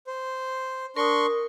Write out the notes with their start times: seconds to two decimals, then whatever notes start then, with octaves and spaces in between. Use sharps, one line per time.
0.07 C5
0.97 D4 A#4 C6 C#6 D#6